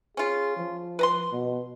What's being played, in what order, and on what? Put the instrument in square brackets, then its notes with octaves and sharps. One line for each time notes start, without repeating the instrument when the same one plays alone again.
[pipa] C#4 F4 [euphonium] G#4
[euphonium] F3
[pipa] B4 A#5 C6
[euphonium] B2